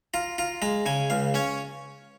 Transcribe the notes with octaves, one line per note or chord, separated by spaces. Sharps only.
F4 A#5
F4 A#5
G#3 A#5
C#3 G#5
C#2 F5
C#4 C#5